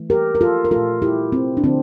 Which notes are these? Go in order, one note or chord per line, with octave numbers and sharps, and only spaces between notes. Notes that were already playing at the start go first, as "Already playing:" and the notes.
Already playing: E3 A3
G4 A#4
A#4
F4 A4
A#4
A3 F4 A4
A#2
E4 G4
C4
D4
D3 F3 A3 C4